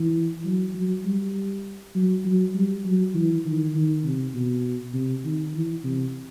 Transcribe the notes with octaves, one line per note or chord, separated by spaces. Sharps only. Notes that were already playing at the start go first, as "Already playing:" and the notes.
Already playing: E3
F#3
F#3
G3
F#3
F#3
G3
F#3
E3
D#3
D#3
C3
B2
C3
D#3
E3
C3